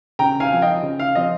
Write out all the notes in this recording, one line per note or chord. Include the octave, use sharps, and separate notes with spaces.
C#3 G5 A#5
F5 G#5
F3 C4
D#5 G5
C#3
F5
F3 C4 D#5